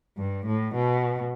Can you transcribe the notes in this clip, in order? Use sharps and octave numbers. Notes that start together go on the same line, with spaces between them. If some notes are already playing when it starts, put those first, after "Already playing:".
G2
A2
B2